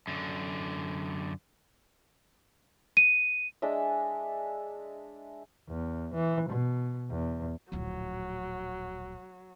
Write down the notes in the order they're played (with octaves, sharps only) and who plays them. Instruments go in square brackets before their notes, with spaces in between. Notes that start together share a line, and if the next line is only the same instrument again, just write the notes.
[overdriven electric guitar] F#2 D3
[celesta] D#7
[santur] G#3 D4 D#5 E5
[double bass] E2
E3
B2
E2
[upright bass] D1 A#1 [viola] F#3